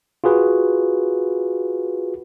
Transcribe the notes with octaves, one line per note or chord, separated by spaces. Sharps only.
F4 F#4 G#4 B4